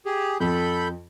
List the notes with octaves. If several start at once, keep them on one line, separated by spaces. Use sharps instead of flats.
G4 G#4
F2 A4 B5 G6